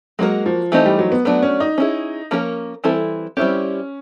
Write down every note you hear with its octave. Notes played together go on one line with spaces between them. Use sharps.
F#3 G#3 A#3 D#4 F#4 A#4
F3
E3 A3 C4 D#4 G4
G3
F#3
B3
F#3 A3 B3 D4 F#4
C#4
D#4
C#4 E4 G#4
F3 A#3 C#4 F#4 A#4
E3 G3 C4 E4 A4
G3 C4 C#4 E4 G4